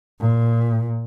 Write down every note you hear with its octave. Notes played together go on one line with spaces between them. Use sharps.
A#2